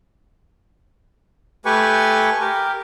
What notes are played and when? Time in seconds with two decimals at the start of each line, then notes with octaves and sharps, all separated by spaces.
1.65 A3 G4 B4 G#5 C#6
2.40 G4 A#4